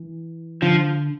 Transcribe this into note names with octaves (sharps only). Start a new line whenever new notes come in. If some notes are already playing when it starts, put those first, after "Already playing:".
Already playing: E3
D3 F3